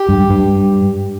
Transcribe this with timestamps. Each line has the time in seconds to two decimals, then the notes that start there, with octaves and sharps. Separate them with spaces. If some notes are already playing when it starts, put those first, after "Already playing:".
Already playing: G4
0.09 G2
0.30 G2